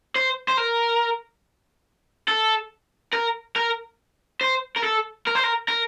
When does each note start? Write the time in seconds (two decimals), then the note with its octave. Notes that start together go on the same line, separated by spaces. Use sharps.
0.16 C5
0.48 C5
0.57 A#4
2.28 A4
3.13 A#4
3.56 A#4
4.41 C5
4.77 A#4
4.84 A4
5.27 A#4
5.35 C5
5.43 A#4
5.68 A#4